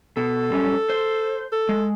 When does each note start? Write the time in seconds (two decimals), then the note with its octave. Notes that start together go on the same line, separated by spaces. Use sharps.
0.17 B2 A4
0.50 F#2 G3 C#4
0.89 C5
1.52 A4
1.69 G#3